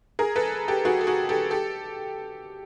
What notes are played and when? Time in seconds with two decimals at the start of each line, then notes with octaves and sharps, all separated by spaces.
0.19 G#4 A#4
0.36 A4 B4
0.68 G4 A4
0.85 F#4 G#4
1.01 A4
1.07 F#4 G#4
1.29 G4 A4
1.51 G4 A4